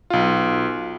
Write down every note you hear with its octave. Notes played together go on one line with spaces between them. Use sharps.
B1 F4